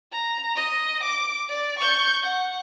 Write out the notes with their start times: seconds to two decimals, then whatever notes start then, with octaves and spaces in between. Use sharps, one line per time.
0.12 A#5
0.55 D#5
1.03 D6
1.49 D5
1.79 C#6 G6
2.22 F#5